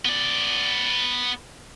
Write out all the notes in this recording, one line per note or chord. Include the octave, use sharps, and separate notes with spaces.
B3 D5